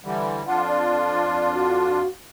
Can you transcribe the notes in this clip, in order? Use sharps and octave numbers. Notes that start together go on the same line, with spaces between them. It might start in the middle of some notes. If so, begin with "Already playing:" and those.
D3 E3 G3
F2 D4 F4 F#5
D5
F#4